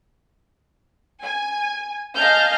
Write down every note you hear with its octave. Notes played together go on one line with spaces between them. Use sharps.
G#5
D#5 F5 G#5 A5 F6 G6